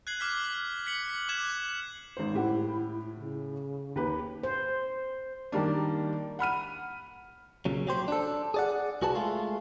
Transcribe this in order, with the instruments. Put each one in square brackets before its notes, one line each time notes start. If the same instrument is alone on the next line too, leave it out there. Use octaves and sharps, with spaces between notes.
[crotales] F#6 G#6 C7 F#7
D6 F6 B6
B6 C#7 F#7
D6 F#6 G#6 E7
[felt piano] G#1 C5
[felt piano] A2 G4 F#5 [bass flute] E4
[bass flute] E4
C#3
[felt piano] D#2 G4 B4
[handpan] C5
[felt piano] D#3 G3 A#3 D4
F#5 B5 F6 D#7
[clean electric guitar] B1 A#2 C#3 F#3
F#3 G4 C5
D4 A4
G#4 D5 F#5
C2 F#4 G#4 B4 A5
G#3 A3 F4